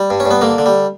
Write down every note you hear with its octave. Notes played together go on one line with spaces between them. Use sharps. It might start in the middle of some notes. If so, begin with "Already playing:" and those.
Already playing: G3
G2
C#4
G2
B3
D3 A#3
D3
G3